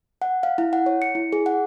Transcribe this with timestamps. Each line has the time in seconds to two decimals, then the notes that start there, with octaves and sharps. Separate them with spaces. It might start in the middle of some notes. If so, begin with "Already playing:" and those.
0.22 F#5
0.43 F5
0.58 E4
0.73 F#5
0.86 C#5
1.02 C#7
1.15 E4
1.33 G#4
1.46 F#5